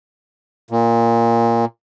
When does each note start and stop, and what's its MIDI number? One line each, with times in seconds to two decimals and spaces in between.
0.70 1.65 46